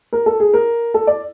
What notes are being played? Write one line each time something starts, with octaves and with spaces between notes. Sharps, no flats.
A#4
A4
G#4
A#4
A4
D5